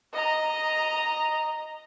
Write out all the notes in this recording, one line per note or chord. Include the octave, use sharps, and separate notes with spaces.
D#5 A#5